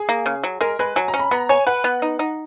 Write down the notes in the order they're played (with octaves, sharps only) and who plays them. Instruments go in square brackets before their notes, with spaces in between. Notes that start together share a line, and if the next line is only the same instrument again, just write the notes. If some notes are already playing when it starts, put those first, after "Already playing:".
Already playing: [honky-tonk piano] G#4
[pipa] A#3
C#3
F#3
[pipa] G#3 [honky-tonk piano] A#4
[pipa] G#3 [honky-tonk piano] B4
[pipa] F#3 [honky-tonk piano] G#5
[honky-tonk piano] A#5
[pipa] C#4
[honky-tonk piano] B5
[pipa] B3 [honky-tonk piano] A#5
[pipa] C#5 [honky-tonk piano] G#5
[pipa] B4 [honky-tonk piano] F#5
[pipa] B3
D#4
D#4